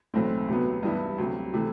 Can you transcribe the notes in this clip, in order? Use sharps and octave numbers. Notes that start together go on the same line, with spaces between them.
B1 A2 E3 A3 C4
D2 C3 F#3 B3
G2 E3 G3 B3 E4
D2 C3 F#3
C3 E3 A3